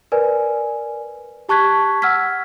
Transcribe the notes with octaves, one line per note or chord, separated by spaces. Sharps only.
A#4 B4 D5 G#5
G4 A5 C#6 F#6 G#6 B6
F#5 E6 F6 G#6 B6